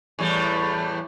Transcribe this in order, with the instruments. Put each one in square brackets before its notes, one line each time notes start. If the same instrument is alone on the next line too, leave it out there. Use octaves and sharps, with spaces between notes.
[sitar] E2 A2 G3